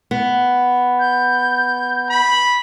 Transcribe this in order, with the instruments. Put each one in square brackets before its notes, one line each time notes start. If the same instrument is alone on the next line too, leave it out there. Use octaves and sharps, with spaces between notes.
[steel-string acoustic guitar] B3
[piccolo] G6
[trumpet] B5